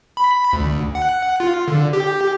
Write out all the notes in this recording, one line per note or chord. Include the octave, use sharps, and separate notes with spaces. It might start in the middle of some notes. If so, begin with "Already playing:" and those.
B5
D2
F#5
F4
D3
G4